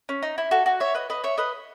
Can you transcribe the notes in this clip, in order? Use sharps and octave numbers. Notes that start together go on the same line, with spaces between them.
C#4
D#4
E4
F#4 A4
F#4
C#5 E5
B4 D#5
B4 D#5
C#5 E5
B4 D#5